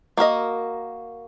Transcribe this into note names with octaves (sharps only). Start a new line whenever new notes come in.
A#3 F#4 A#4 D#5